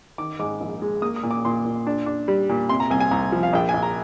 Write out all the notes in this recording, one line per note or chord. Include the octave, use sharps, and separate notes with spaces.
D#3 D6
G#2 D6
A#1
G#3
A#3 D#6
D#6
A#2
D6
A#2 C6
A#2
D4
D4
G3
A#2
C3 C6
A#5
C2 G#5
G#5
C2 A#5
F3
F5
A#1 G5
A#1 G#5
A#5